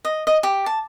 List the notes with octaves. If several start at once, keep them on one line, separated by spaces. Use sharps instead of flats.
D#5
D#5
G4
A5